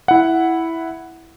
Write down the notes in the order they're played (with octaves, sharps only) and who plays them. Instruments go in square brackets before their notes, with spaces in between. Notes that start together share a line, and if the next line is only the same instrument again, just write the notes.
[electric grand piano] E4 F#5